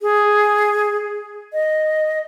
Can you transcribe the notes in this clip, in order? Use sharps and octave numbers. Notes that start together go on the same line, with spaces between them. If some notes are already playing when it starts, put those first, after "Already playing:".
G#4
D#5